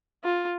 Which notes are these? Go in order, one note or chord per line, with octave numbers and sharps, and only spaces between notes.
F4